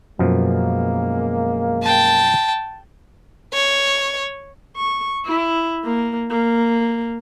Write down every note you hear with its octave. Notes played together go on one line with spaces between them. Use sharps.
F#2 B2 F3 G#3 A#3
G5 A5
C#5
C#6
E4
A#3
A#3